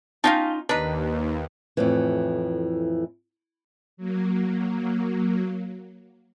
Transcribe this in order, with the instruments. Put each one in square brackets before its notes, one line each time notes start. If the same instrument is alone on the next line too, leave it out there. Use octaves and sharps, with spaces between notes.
[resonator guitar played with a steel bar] C#4 D#4 F4 [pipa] F5 G5 A5
[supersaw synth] D#2 [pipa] D4 D#4 [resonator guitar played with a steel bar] B4
[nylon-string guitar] F2 A2 E3
[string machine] F#3 A#3